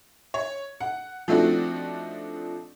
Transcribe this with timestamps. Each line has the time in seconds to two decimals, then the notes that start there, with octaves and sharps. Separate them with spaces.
0.34 C#5
0.80 F#5
1.28 F3 A3 C4 D4 D#4 F#4